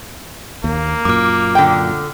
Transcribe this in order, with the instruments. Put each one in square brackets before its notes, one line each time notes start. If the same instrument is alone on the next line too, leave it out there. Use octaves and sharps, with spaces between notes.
[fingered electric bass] D#2 [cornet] A#3
[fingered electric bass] F#2 A#2 [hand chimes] D6 F6
[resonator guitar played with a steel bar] D3 G5